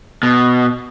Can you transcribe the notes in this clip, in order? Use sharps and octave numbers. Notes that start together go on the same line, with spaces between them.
B2